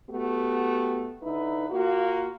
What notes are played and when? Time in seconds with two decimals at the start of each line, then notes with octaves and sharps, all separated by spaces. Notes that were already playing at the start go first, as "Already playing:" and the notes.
0.10 A3 B3 F#4 G4
1.23 D3 D#4 E4 B4
1.70 A#3 F4 F#4